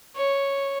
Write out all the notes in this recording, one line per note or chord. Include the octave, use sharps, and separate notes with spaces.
C#5